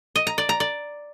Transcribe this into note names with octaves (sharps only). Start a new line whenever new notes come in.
D#5
A#5
D5
A#5
D5